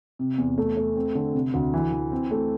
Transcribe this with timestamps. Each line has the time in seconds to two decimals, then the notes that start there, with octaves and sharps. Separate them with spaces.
0.19 C3
0.38 E2
0.58 A3
0.77 A3
0.95 C4
1.15 D3
1.34 C3
1.54 D2
1.74 E3
1.92 E3
2.12 C4
2.31 A3